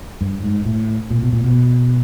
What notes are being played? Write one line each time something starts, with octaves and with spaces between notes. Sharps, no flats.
G2
G#2
A2
A#2
B2
A#2
B2